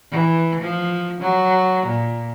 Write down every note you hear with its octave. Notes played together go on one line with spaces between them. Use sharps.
E3
F3
F#3
A#2